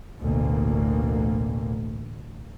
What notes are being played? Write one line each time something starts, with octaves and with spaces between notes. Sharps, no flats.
A1 D2 B2 A#3